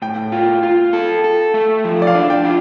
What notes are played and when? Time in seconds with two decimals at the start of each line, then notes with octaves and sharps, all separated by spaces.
0.02 A2 G5
0.32 F4
0.63 F4
0.93 A4
1.24 A4
1.54 A3
1.84 F3
2.02 D5
2.07 F5
2.15 D4
2.30 G5
2.45 F4